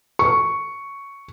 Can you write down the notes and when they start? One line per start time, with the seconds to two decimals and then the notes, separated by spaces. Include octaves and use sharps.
0.19 C#6